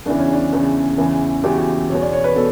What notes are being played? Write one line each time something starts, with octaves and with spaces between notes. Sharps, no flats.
E2 C#3 E3 D4
C#4
D4
E2 C#3 E3
E2 C#3 E3
E2 C#3 E3 G4
F#4
G4
E2 B2 C#5
D5
C#5
B4
B2 A4